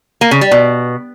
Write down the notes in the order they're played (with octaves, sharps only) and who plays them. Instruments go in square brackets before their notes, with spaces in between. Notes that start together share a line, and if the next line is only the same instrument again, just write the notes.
[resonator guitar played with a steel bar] A#3
C#3
G3
B2